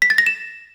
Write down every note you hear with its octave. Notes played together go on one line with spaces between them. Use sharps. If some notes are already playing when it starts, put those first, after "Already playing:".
B6
A6
A#6
E7